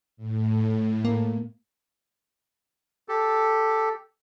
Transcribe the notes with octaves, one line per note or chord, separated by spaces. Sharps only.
A2
A#3
G4 A4